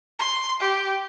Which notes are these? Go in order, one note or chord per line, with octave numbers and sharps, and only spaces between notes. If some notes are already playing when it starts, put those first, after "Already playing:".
C6
G4